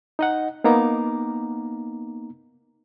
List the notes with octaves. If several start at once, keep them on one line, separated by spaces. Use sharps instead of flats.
D#4 D#5 F#5
A#3 B3 D#4 A#5 D6